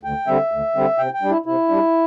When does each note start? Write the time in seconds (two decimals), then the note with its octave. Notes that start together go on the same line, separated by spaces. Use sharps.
0.03 D2 G5
0.27 D3 G3 C4 E5
0.52 D2
0.75 D3 G3 C4
0.98 C3 G5
1.14 G5
1.22 G3 D4
1.29 E4
1.46 C3 E4
1.69 G3 D4